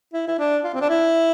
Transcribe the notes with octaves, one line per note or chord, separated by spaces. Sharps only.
E4
E4
D4
F4
C4
D4
E4